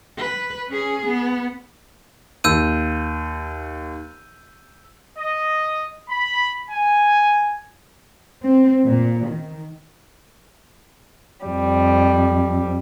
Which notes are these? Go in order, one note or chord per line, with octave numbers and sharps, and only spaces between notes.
B4
C#4 G#4
B3
D#2 E6 G6 D#7
D#5
B5
G#5
C4
A#2
D#3
F2 G3